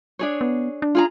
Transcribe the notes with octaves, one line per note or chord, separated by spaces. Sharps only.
D4 G#4 C#5
B3
D4
F4 G#4 A#5